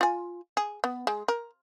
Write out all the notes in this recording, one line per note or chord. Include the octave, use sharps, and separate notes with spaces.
F4 G#5
G#4
B3
G#3
A#4